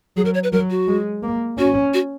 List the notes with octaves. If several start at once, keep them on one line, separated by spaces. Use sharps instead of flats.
F#3 G#4
A#4
C#5
B4
F#3 A#4
F#4
G#3
A#3
C#4 F#4
F#4